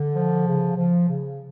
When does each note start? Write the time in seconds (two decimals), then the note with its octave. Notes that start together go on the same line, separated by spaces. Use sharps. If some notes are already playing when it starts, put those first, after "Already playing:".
Already playing: D3
0.15 F3
0.46 C#3
0.76 F3
1.07 C#3